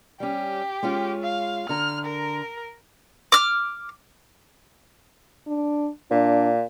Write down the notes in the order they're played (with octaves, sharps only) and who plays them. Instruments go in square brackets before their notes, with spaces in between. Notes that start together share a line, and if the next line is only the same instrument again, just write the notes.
[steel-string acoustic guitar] G3 C#4 [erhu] G4
[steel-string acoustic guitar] G#3 C#4 F4
[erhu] F5
[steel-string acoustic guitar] D3 A#5 [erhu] F6
[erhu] A#4
[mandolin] D6 F6
[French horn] D4
[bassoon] A#2 [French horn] D4